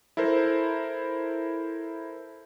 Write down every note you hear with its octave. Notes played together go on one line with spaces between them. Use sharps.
E4 A4 A#4 C5